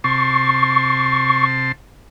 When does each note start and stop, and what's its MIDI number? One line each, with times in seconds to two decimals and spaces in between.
0.04 1.72 48
0.04 1.72 81
0.04 1.72 84
0.04 1.46 85